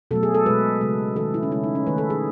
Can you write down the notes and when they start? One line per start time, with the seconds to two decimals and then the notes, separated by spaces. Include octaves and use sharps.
0.11 B2 F#3 A3 A4
0.23 G#4
0.34 A4
0.46 B2 G#3 B4
0.81 C#3 G#3
1.16 D#3 A4
1.20 G#3
1.34 E4
1.43 C#4
1.51 C#3 G#3 E4
1.64 D#4
1.75 C#4
1.87 D#3 A3 B4
1.98 A4
2.10 G#4